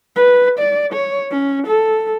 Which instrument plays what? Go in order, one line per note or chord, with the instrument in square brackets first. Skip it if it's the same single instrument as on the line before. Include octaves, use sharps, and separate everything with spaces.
[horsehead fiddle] B4
D5
C#5
C#4
A4